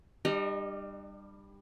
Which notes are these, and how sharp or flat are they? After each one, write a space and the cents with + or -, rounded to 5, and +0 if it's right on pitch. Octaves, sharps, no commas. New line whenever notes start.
G3 +15 D4 +45 D#5 +0